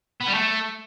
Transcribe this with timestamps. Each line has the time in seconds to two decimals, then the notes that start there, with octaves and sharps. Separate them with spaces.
0.21 B3
0.27 G3
0.34 A3